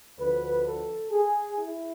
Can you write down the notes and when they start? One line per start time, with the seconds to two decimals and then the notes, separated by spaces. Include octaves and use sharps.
0.18 D2 D3 F3 B4
0.65 A4
1.12 G#4
1.58 E4